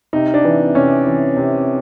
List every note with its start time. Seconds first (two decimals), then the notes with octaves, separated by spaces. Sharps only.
0.13 C3 D#4
0.34 D4
0.45 E3
0.75 C3 C#4
1.06 E3
1.37 C3